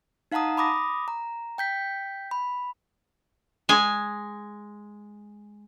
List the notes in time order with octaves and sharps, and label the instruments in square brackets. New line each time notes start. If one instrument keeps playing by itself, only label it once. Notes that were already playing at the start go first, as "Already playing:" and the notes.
[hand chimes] D#4 F5 F#5 A5 A#5 D#6
B5 D6 D#6 A#6
A#5
G5 G6 B6
B5
[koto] G#3 G#5